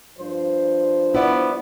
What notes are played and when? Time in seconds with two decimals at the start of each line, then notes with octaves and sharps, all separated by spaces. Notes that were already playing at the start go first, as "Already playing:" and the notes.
0.19 G2 F3 C5
1.15 B3 E4 D5